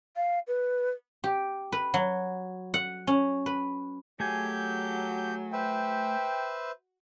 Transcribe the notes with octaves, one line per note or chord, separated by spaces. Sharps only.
F5
B4
G4
B4
F#3
F#5
C#4
B4
F#3 A3 G4 G#4 G#5 G6
B4 C5 E5 G5